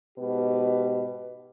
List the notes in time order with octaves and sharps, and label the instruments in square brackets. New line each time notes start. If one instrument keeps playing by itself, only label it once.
[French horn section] G#2 B2 G4 B4